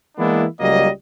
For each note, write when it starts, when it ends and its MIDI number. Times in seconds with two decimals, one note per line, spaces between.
0.18 0.45 52
0.18 0.45 56
0.18 0.45 58
0.18 0.45 59
0.18 0.45 62
0.18 0.45 64
0.60 0.88 37
0.60 0.88 54
0.60 0.88 55
0.60 0.88 58
0.60 0.88 75